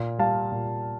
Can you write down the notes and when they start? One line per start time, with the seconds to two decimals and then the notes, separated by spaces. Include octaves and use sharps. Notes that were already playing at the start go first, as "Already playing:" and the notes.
Already playing: A#2
0.19 G3 F5 A5
0.52 A#2